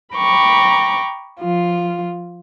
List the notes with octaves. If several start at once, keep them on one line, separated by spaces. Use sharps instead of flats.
G5 A#5 B5 C#6 D6
F3 F4